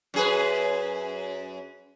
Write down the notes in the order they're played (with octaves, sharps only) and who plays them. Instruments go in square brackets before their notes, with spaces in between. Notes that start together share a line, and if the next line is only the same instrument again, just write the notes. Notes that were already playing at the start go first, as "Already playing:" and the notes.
[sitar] F#2 G#4 B4